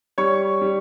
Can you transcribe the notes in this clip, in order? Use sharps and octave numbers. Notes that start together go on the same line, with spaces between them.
G3 C#5 C#6
G3